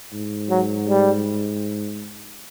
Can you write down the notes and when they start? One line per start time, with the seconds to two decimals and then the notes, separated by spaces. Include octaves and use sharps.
0.13 G#2
0.50 F#3
0.88 G3